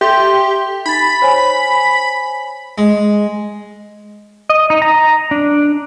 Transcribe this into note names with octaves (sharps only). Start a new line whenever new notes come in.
G4 A4 E5 C6
D#4 B5 A6
C5 C#5 G#5
G#3
D#5
D#4
A#5
D4